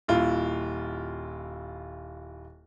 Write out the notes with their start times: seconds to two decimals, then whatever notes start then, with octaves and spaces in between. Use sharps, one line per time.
0.08 D#1 E4 F4